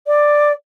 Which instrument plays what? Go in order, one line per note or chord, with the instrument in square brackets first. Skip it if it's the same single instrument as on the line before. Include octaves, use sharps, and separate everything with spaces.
[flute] D5